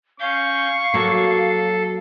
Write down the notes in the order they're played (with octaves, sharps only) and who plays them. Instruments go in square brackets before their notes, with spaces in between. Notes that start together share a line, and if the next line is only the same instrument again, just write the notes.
[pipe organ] C#4 G6 [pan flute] F5 [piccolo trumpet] C#6
[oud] F#3 A#3 [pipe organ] A4